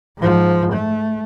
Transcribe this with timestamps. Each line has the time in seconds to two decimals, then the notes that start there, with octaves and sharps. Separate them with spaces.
0.18 G#2 F3
0.72 A3